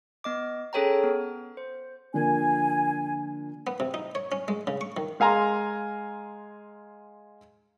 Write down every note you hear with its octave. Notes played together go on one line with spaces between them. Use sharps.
B3 D#5 D6
C#4 G#4 A4 C#5 G5 A#5
B3
C5
D3 F3 A#3 G#5
B3
C3
D#4
C#5
C#4
G#3
C#3
C#6
D#3
G#3 F5 G#5 A#5 C6